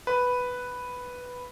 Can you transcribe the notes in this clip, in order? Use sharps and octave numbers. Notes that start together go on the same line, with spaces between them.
B4